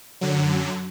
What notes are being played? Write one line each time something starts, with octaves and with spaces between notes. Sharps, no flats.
F#2 D3 F#3